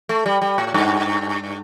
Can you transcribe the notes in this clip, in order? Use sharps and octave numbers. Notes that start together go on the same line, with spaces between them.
A3
G3
G3
A2
G2